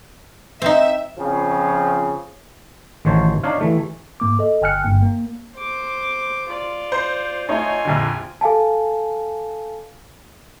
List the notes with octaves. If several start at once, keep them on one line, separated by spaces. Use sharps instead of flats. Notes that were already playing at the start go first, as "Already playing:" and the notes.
C4 D#4 E5
F2 C#3 F3
A1 D#3 C5 C#5 A5
D4 D#4 C#5 F5
E3 A3
G#2 A#3 D6
A4 D#5
G1 G5 G#5 F6 F#6 C#7
G1 G2 A#3 G5
A#3
C5 D6
F4 D5
C5
A3 D#4 F4 C#5 G#5
A#1 F2 D3
A4 F5 G#5 A5